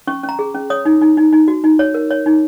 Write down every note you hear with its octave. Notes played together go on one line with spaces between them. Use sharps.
C#4 C#6
C#4
A#5
G#4
C#4
C#5 D#6
D#4
D#4
D#4
D#4
F#4
D#4
C#5
A#4
C#5
D#4